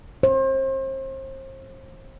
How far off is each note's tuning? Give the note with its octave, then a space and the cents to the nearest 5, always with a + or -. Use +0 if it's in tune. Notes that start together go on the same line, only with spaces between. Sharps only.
C5 +35